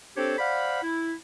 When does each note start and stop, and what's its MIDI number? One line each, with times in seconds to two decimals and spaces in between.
0.16 0.35 60
0.16 0.35 62
0.16 0.35 67
0.16 0.35 69
0.16 0.35 72
0.16 0.35 73
0.38 0.79 72
0.38 0.79 74
0.38 0.79 77
0.38 0.79 78
0.38 0.79 83
0.82 1.13 64